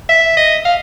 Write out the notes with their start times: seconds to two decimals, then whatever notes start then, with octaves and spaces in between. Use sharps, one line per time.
0.09 E5
0.37 D#5
0.65 F5